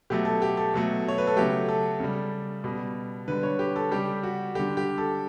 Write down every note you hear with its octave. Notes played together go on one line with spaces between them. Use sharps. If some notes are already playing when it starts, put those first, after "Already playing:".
B2 F#3 A3 G4
A4
G4
A4
B2 F#3 A3
C#5
B4
A4
C#3 F#3 A3 G4
A4
C#3 G3
B2 G3
D3 G3 B4
C#5
G4
A4
C#3 G3 G4
F#4
D3 G3 G4
G4
A4